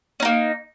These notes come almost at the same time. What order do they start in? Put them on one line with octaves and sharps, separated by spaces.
C#4 D#4 A#3